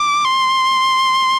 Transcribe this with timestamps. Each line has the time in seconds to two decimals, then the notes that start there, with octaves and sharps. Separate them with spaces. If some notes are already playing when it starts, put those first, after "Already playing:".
Already playing: D6
0.25 C6